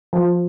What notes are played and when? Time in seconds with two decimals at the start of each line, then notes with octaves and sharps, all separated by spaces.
0.13 F3